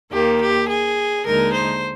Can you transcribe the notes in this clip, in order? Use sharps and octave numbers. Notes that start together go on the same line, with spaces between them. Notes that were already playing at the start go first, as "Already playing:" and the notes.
D#2 D#3 A#3 G4
G4
G#4
D#2 D3 G#3 D#4 A#4
C5